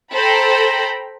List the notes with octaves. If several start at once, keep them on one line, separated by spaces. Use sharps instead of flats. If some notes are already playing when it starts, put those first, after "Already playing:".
A4 C5 G5 A#5 B5